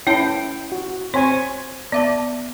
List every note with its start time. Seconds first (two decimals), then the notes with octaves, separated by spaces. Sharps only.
0.07 C#4 E4 C#5 G5 A5
0.72 F#4
1.14 C4 C5 C#5 G#5 C6
1.92 B3 D5 E5 A5